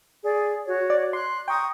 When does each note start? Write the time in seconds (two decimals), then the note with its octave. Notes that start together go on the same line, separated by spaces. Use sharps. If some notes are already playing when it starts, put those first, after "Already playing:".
0.24 G#4 D5
0.67 F#4 C#5
0.90 D5
1.13 C6 F#6
1.48 G5 A#5 C#6 D#6